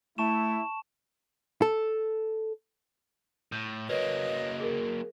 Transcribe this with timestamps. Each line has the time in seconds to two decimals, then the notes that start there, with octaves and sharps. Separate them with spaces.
0.18 A3 E4 A5 C#6 E7
1.62 A4
3.52 A2 G6
3.89 F#3 A#3 B4 C#5 D#5
4.60 G#4 A#4